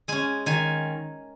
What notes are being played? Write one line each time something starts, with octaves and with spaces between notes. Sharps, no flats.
G#3 C#4 G#5
D#3 G#5